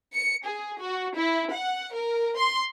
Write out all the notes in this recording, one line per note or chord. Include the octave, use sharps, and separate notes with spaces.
C#7
G#4
F#4
E4
F#5
A#4
C6